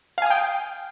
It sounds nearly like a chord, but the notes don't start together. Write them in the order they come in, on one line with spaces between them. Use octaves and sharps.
F5 G#5 D#6 G5